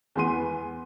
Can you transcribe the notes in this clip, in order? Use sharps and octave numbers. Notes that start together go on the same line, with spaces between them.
E2 E3 B3 C6 D#7